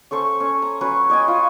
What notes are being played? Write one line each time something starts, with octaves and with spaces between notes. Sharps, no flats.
C#4 A4 C5 C#6
C#4
A#5
F#3 C#4 B4 C#5
C#5 D#5 G5 G#5
F4